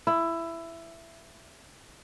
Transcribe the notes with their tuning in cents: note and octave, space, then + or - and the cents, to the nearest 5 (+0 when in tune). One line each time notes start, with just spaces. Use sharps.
E4 +15